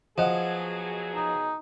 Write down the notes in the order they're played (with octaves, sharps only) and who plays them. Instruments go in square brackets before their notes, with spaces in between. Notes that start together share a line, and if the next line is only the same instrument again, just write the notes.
[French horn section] B2 F#3 G#4 [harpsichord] F3 [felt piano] D#5 F#5
[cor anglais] D#4